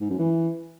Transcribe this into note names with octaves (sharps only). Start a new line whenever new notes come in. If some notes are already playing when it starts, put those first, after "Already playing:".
G#2
F#2
E3